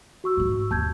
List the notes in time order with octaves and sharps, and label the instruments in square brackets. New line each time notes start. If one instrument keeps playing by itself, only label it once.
[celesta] F#4 C#6 E6
[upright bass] G#2 G#3
[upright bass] D#2 C#4 [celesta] A5 G6 G#6